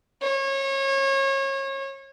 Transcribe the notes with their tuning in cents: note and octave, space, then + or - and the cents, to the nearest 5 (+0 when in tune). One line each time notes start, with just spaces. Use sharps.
C#5 -30